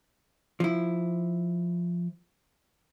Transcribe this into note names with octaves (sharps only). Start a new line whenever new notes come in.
F3 E4